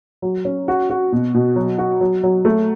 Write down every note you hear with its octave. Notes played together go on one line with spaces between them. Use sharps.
F#3
C#4
F#4
F#4
B2
B2
F#3
F#4
F#3
F#3
A3